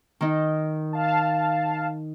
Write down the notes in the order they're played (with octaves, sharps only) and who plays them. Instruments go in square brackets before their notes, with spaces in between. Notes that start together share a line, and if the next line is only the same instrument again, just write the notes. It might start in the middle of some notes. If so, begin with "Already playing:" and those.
[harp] D#3 D#4
[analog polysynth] F5 A5